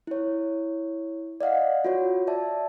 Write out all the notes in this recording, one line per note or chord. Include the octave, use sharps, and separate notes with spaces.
E4 C#5
D5 D#5 F5 F#5
F4 F#4 C#5
D5 E5 A5